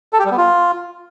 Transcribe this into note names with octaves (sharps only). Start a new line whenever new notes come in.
A4
G4
G3
B3
F4